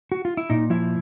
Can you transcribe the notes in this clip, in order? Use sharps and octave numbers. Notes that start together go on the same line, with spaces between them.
F#4
F4
E4
A#2 D#4
F3 E4